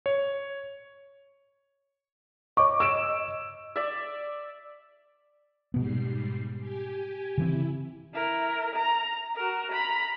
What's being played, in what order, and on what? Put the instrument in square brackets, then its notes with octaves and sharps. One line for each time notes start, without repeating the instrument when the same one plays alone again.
[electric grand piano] C#5
[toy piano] C#5 C#6 [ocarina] D#5 [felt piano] D6
[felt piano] E6 D7 E7
[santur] D5 E5
[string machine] G#2 G3 C7 [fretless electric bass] B2 B3
[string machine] G4 G#5
[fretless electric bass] C#3 E3 C4 [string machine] E4
[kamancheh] E4 A#4
A#5
F#4 A#4
A#5 B5